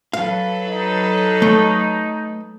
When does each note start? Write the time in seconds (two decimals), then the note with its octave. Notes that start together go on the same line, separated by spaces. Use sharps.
0.13 F#3 A4 B4 F5
0.68 D#4
1.42 A3